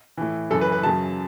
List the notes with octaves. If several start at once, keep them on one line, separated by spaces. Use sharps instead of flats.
A2 E3
F#2 C#3 E3 A4
B4
B4
F#2 C#3 F#3 A5